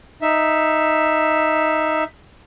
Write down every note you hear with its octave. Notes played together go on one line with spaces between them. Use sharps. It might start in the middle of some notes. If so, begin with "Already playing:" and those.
D#4 E5